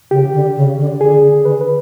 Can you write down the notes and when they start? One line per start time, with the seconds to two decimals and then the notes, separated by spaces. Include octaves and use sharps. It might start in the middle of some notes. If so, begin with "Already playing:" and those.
0.11 C#3 G4
0.33 D3
0.56 C#3
0.78 D3
1.01 D3 G#4
1.45 D3 B4
1.61 B4